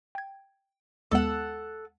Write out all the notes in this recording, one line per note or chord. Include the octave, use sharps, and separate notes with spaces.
G5 G#6
D#2 G#3 B3 A4 F#5